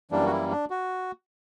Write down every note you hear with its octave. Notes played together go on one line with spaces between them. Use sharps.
F#2 E3 G3 A#3 D4
F#4
E4
D4
F#4